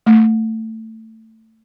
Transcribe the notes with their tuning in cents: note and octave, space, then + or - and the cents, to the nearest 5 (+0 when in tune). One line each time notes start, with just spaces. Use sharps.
A3 +15